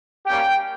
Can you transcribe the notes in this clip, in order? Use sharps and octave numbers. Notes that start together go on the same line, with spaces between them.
G3 A#3 C#4 G4 G5